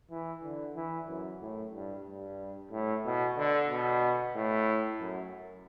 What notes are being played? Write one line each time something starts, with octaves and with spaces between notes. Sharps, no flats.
E3
D3
E3
F#2
A2
G2
G2
A2
B2
D3
B2
A2
F#2